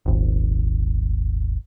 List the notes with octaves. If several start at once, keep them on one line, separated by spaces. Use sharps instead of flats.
D#1 G#1